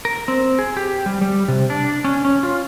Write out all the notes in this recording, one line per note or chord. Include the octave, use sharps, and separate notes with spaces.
A#4
C4
G#4
G4
G3
G3
C3
D4
C#4
C#4
F4